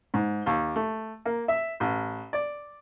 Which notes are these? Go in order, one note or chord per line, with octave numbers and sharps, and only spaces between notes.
G#2
D#2
A3
A#3
E5
A1
D5